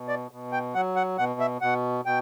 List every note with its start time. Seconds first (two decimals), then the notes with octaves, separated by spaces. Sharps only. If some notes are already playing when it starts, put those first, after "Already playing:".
Already playing: B2
0.08 D5
0.31 B2
0.52 G5
0.74 F#3 F#5
0.96 F#5
1.18 B2 F#5
1.40 E5
1.61 B2 F#5
2.05 B2 G5